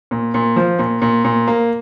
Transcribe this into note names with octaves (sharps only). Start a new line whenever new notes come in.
A#2
A#2
F3
A#2
A#2
A#2
A#3